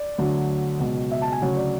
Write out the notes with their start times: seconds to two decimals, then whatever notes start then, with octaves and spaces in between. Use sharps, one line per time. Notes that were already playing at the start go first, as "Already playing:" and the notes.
Already playing: D5
0.18 D2 D3 F#3
0.80 C#2 B2 F#3
1.12 E5
1.22 A5
1.32 G#5
1.42 D2 C#3 F#3 C#5
1.57 D5